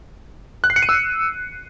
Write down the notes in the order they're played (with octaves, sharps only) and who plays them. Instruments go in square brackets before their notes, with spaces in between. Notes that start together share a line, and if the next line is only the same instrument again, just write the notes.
[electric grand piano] F#6
C7
C#7
D#7
E6